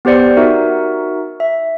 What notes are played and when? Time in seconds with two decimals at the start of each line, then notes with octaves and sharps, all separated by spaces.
0.05 B3 G4 C5 D5 C#7
0.37 D#4 F#4 A#4 E5
1.40 E5